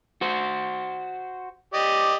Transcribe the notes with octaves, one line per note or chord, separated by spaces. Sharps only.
F#4 C5
G4 D5 D#5